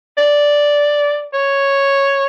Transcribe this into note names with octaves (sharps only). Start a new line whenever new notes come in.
D5
C#5